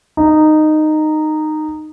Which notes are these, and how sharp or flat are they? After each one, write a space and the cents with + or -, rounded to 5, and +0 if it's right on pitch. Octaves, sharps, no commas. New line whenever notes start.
D#4 -15